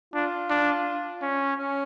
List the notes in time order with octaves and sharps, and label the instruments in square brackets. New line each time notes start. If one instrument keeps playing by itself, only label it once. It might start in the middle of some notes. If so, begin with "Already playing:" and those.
[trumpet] D4 [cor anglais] F4
[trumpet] D4
C#4
[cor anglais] C#4